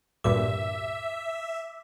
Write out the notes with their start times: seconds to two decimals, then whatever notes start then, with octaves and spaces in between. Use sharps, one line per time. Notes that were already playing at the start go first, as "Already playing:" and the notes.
0.24 D2 G2 A#2 E5 D6